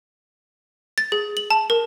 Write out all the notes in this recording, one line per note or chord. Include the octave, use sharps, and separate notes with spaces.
A6
G#4
F#7
A5
A#4